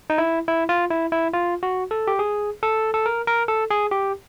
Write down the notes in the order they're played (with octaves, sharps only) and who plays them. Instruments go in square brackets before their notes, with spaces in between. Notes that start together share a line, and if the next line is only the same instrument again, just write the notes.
[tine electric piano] D#4
E4
E4
F4
E4
E4
F4
F#4
A4
G4
G#4
A4
A4
A#4
A#4
A4
G#4
G4